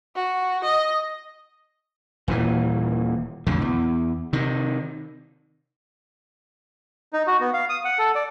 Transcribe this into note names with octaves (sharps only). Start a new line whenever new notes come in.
F#4
D#5
D#1 A#2 E3
B1 F2 A2 D3
E2
C3 D#3
D#4
F#4
B3
F5
D#6
F#5
A4
D5